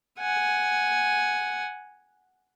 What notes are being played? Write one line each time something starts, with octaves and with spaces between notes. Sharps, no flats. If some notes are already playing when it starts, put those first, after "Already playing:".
F#5 G#5